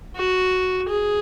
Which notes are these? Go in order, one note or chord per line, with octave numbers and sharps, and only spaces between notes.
F#4
G#4